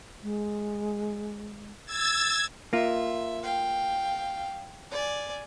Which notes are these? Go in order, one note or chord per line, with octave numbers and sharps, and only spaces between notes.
G#3
E6 G#6 A6
A#3 F4 E5
F5 G5
D5 G#5